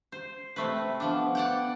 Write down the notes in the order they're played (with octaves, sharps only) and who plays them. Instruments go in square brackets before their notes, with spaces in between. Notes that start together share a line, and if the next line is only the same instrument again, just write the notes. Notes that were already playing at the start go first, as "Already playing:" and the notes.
[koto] C5
C3 A3 B4
[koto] F3 D4 [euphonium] B3
[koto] D5 F#5 G5